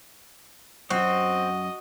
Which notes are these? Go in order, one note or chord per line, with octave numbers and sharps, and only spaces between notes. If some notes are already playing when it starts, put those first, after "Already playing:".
F#2 C4 F#4 D#5